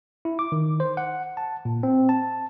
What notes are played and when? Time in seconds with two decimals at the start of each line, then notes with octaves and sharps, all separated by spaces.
0.25 E4
0.39 D6
0.52 D#3
0.80 C5
0.97 F#5
1.37 A5
1.65 A#2
1.83 C4
2.09 A5